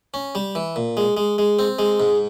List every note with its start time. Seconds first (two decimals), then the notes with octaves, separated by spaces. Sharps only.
0.14 C#4
0.35 G3
0.55 E3
0.76 A#2
0.97 G#3
1.17 G#3
1.38 G#3
1.59 C4
1.79 G#3
2.00 G#2